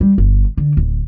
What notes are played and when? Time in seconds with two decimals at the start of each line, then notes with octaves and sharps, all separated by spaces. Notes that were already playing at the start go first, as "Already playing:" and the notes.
0.01 G3
0.18 G1
0.57 D3
0.77 D1